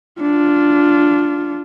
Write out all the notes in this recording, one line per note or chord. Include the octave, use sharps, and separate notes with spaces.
D4 F4